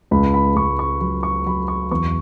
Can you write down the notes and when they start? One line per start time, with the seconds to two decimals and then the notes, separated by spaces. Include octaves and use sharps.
0.11 C#2 B5
0.34 B5
0.56 C#2 C#6
0.79 C#6
1.01 F#3 B5
1.23 C#6
1.46 F#3 B5
1.68 C#6
1.91 E2 C#6